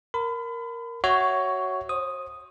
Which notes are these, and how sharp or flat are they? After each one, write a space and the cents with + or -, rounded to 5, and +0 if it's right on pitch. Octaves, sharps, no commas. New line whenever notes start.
A#4 +0 B5 +35
F#4 +10 C#5 +0 E5 +0
C5 +40 D#6 +0